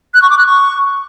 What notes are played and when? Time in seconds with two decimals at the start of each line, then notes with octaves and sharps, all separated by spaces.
0.14 F#6
0.22 C#6
0.30 D6
0.38 F#6
0.46 C#6